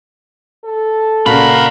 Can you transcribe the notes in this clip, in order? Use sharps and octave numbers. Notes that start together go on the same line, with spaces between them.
A4
C2 A#2 C#3 F#4 A#4 F5 B5